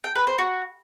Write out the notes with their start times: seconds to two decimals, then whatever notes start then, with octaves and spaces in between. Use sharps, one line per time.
0.04 G5
0.15 B4
0.27 C5
0.38 F#4